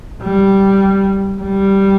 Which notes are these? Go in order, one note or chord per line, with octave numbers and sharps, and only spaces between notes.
G3
G3